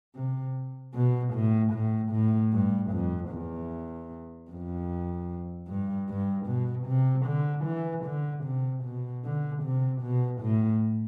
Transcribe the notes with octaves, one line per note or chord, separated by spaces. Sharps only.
C3
B2
A2
A2
A2
G2
F2
E2
F2
G2
G2
B2
C3
D3
E3
D3
C3
B2
D3
C3
B2
A2